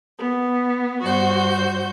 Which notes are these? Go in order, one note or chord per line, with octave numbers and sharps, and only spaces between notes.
B3
G2 F#4 C5 G6